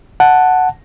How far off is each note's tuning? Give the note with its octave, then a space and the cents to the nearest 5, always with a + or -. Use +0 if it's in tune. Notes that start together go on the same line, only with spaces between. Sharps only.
F#5 +0 A5 +0